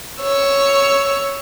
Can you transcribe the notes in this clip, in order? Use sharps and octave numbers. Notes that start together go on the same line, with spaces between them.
C#5 E6